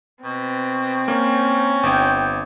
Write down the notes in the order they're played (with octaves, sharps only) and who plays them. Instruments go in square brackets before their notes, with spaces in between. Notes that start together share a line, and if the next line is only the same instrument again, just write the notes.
[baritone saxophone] B2 [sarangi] C4
[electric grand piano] A#3 [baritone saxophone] C#4
[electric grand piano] G1 [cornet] G5